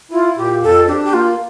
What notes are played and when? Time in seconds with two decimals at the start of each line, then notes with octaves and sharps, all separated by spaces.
0.11 E4 F4
0.37 A#2 G4
0.62 F2 A4
0.88 D4 G4
1.05 G4
1.13 A#3 F4